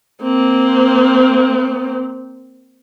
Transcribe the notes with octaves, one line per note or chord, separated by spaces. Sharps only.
A#3 C4